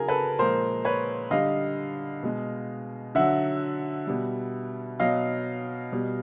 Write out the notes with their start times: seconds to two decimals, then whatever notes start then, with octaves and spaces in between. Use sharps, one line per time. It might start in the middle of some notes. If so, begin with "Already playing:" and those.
Already playing: C#3 F#3 G#4 A#4
0.08 A4 B4
0.39 A#2 F3 G#3 A#4 C5
0.85 B4 C#5
1.31 D3 G3 D#5 F5
2.23 B2 G#3
3.15 D3 F#3 E5 F#5
4.07 B2 G3
5.00 B2 F#3 D#5 F5
5.92 B2 G3